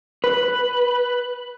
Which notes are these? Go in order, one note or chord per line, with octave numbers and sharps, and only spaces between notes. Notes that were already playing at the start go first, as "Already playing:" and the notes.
B4